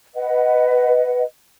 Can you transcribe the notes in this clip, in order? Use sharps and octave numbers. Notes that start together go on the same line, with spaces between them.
B4 D#5 F#5